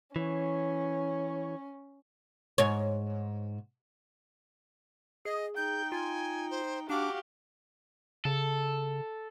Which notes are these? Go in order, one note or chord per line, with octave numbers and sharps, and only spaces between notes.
E3 C#4 C#5
G#2 C#5
G#4 D#5
D#4 G5 G6
F4 G#5
C5
D4 F#4 G4 F5 D6
C#3 A4